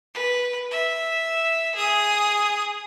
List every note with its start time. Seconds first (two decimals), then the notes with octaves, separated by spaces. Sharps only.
0.14 B4
0.71 E5
1.75 G#4 D#6